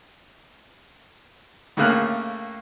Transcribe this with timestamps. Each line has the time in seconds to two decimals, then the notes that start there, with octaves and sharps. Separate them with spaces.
1.77 A2 C#3 A3 A#3 F6 F#6